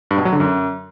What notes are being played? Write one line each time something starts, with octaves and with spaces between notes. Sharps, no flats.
G2
B2
F#3
D3
F#2